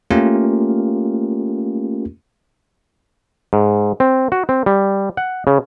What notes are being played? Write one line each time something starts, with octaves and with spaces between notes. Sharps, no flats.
A3 A#3 C#4 F4 G4 A#4
G#2
C4
F#4
C4
G3
F#5
C#3